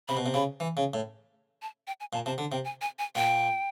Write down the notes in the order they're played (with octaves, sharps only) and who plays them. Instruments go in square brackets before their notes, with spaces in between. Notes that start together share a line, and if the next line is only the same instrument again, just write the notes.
[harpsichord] C3 [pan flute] B5
[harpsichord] B2
C3
[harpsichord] C#3 [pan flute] B5
[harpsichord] E3
C#3
A2
[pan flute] A5
G5
G#5
[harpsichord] A#2 [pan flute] A5
[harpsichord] C3 [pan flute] A5
[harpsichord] D3
[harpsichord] C3 [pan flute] G5
[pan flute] G#5
G#5
G#5
[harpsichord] A#2 [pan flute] G5